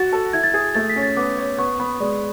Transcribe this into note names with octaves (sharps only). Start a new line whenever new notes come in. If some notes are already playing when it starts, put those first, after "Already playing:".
Already playing: F#4 A6
A4
E4 G#6
A6
G#4 G#6
A3 A6
B6
C#4
A6
B3 D6
C#5
B3 C#6
B3 B5
G#3 D5